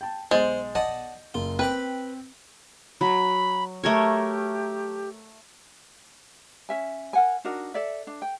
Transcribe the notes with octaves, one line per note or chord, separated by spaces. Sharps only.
G5 A5
B1 G#3 C5 G6 A6
D5 D#5 F#5 A5
F#1 F4
C4 B4 G5 B5 D6
F#3 B5
A3 G4 A#4 C#5
C#4 E5 G#5
A#4 F#5 G#5
D4 D#4 F#4 A#4
A4 D5 E5
D4
G5